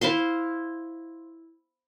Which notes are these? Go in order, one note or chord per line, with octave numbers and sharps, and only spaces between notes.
E4 C5 F5 C6